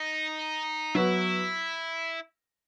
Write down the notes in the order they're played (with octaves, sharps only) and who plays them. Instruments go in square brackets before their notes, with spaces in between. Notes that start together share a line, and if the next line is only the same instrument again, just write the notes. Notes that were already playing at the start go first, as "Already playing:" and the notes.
Already playing: [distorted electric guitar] D#4
[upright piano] F#3 B3 F#4 [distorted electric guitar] E4